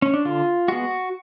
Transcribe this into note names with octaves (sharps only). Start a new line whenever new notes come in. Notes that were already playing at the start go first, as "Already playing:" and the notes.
C#4
D4
D3 F4
G#3 B3 F#4